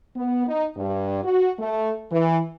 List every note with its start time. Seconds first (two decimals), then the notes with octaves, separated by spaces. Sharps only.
0.16 B3
0.48 D#4
0.77 G2
1.24 F#4
1.59 A3
2.12 E3